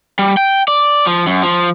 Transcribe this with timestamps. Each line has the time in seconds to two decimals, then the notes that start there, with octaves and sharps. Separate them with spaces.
0.19 G3
0.37 G5
0.68 D5
1.06 F3
1.27 F#2
1.43 F3